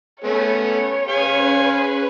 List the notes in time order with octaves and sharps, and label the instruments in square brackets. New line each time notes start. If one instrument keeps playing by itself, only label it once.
[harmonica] A3 B3 C#4 [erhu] C#5
[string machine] C#4 B4 [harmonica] G#4 F5 G#5